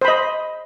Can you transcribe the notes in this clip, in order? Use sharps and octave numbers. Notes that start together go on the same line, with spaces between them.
C5 D#5 B5